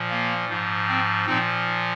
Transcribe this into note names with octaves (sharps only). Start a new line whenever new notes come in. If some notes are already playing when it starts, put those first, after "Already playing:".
Already playing: A#2 F3
A#3
G#2 F3
C4
A#2 F3 C4 D#4